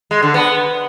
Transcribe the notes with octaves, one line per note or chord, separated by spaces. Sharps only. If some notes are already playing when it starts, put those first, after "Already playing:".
G#3
D3
B3